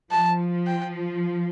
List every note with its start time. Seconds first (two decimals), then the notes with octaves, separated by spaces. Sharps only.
0.11 F3 A5
0.67 G5